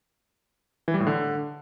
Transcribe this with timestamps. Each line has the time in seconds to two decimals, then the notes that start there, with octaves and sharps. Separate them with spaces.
0.88 E3
0.94 G3
1.00 A2
1.07 D3